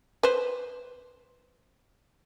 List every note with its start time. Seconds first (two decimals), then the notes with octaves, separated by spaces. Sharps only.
0.23 B4 C5